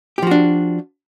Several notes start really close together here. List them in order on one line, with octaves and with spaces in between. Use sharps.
G4 F3 F#4 D4